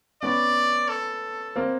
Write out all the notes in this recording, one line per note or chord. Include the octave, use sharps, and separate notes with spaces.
B3 C#4 D5
A4
A#3 C4